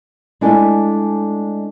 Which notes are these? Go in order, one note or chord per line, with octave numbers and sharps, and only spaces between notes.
G#3 A3 D4 E4 A4 G#5